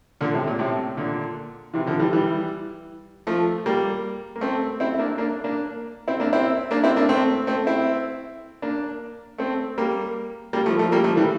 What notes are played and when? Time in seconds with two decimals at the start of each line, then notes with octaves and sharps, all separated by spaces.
0.21 A#2 D3
0.34 A2 C3
0.47 A#2
0.59 A2 C3
0.97 A#2 D3
1.74 C3 E3
1.86 D3 F3
2.00 E3 G3
2.13 E3 G3
3.27 F3 A3
3.66 G3 A#3
4.36 A#3
4.41 A3 C4
4.80 C4 E4
4.95 E4
4.99 A#3 D4
5.18 A#3 D4
5.44 A#3 D4
6.08 C4 E4
6.20 A#3 D4
6.33 C4 E4
6.71 A#3 D4
6.84 C4 E4
6.96 A#3 D4
7.09 A3 C4
7.47 A3 C4
7.67 C4 E4
8.62 A#3 D4
9.38 A3 C4
9.78 G3 A#3
10.53 G3 A#3
10.66 F3 A3
10.79 F3 A3
10.92 G3 A#3
11.04 F3 A3
11.17 E3 G3